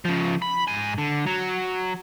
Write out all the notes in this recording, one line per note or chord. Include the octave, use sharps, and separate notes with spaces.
C#3 F3
B5
G#2 G#5
D3
F#3